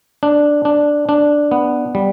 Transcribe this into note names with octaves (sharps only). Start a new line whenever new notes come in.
D4
D4
D4
B3
G3